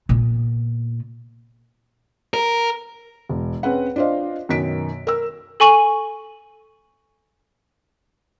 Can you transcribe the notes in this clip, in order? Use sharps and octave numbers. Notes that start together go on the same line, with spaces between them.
A#2 B3
A#4
E1
C4 C#4 G#4 B4 F#5
D4 F4 C5 D#5 F5
F#2 B2 D#3 B6 D7
A#4 E6
A4 G#5 C#6 D#7 F#7